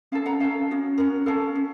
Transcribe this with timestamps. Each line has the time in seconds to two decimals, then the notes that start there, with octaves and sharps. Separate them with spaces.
0.12 C#4 A4 F5 A5
0.26 F#5 A#5
0.40 C#4 F5 A5
0.44 A4
0.71 C#4 F#4
0.98 C#4 F#4 A#4
1.26 C#4 A4 F5 A5
1.55 C#4